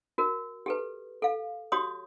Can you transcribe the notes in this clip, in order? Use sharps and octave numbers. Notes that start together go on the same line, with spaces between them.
F#4 A#4
G4 A4 B4
A4 F5
F#4 G4 C#5 C6 D#6